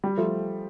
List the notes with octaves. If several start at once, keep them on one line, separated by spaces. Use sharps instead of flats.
G3
F3 A3